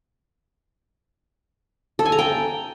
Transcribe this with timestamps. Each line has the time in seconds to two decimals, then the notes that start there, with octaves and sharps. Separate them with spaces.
1.99 A4
2.06 G#5
2.12 A#5
2.19 G5